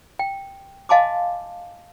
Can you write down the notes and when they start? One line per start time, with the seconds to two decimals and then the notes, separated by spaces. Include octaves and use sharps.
0.19 G5
0.89 D#5 F5 G#5 A5 C6 D6